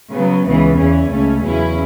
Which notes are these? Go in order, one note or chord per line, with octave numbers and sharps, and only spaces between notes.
C#3 F#3 B3
C#2 C#3 E3 B3
E2 E3 C#4
C#2 C#3 A3 C#4
E2 C#3 F#3 C#4 E4